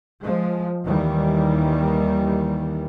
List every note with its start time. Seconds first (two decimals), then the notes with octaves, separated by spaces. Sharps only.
0.22 F3 G#3
0.84 D#2 D#3 E3 G3